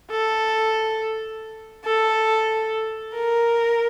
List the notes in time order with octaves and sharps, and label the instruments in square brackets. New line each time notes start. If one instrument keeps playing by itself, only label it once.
[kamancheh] A4
A4
A#4